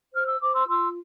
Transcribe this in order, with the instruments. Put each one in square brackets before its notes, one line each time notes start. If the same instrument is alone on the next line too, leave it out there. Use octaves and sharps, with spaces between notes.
[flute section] C5 F6
E6
C5 D6
C6 E6
F4 C6 E6